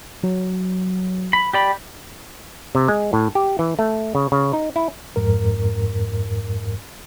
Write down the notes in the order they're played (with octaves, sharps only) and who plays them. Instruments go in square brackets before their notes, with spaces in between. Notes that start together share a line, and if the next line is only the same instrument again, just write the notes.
[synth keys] F#3
[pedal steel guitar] B5
G4 D5 B5
[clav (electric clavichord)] C3
G#3
A2
G4
E3
A3
C#3
C#3
D#4
E4
[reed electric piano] F2 G#2 A#4